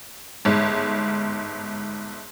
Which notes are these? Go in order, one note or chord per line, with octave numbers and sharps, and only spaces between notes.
G1 G#2